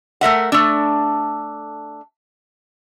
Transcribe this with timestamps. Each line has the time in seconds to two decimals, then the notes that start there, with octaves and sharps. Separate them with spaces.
0.21 A3 A#4 E5 F#5
0.52 A3 D4